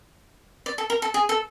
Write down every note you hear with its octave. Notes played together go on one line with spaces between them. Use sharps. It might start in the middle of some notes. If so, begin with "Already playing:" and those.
D5
A4
A#4
A4
G#4
A4